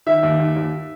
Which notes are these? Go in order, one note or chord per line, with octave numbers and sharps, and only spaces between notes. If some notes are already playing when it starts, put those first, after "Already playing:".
D#3 E5
D#2
D#2
D#2